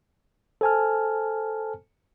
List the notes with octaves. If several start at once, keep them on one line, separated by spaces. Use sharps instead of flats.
A4 C5 G#5 A5 F6